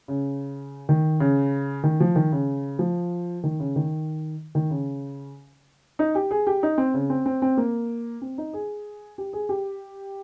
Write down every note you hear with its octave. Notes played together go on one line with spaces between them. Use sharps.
C#3
D#3
C#3
D#3
F3
D#3
C#3
F3
D#3
C#3
D#3
D#3
C#3
D#4
G4
G#4
G4
D#4
C4
C#3
C4
C4
C4
A#3
C4
D#4
G#4
G4
G#4
G4